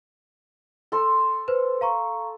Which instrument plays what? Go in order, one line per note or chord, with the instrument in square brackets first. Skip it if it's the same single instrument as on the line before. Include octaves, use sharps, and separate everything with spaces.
[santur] A4 C6
[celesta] B4 C5
F5 A#5 C#6